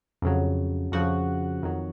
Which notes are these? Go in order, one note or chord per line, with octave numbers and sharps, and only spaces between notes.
F2 C#3 F#3
F2 C#3 F3 F#4 F#5
F2 D#3 F#3